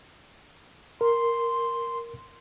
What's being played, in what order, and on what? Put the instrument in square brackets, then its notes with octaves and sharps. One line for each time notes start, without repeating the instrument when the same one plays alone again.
[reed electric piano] A#4 [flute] C6